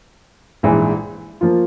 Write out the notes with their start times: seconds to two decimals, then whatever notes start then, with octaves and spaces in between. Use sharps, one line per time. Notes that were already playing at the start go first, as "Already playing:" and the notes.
0.63 A#1 G#2 E3 G#3
1.41 F3 A#3 F4